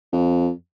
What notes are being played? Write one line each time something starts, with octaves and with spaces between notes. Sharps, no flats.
F2